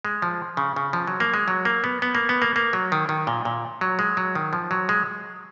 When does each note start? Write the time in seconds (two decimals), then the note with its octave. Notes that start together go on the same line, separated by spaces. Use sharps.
0.05 G#3
0.22 F3
0.57 C#3
0.76 C#3
0.93 F3
1.07 F#3
1.20 A#3
1.34 G#3
1.48 F#3
1.65 A#3
1.84 B3
2.02 B3
2.15 A#3
2.29 B3
2.42 A#3
2.56 A#3
2.73 F#3
2.92 D#3
3.09 D#3
3.27 A#2
3.45 A#2
3.81 F#3
3.99 G#3
4.17 F#3
4.35 D#3
4.53 F3
4.71 F#3
4.89 G#3